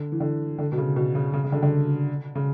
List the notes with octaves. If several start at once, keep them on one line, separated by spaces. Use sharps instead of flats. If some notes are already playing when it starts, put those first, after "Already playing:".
Already playing: D3
E3
D3
D3
B2
C#3
B2
C#3
C#3
C#3
D3
D3
C#3